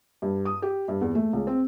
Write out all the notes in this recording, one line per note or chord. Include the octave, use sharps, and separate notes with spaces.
G2
D#6
G4
G2
E2
A3
C#2
C4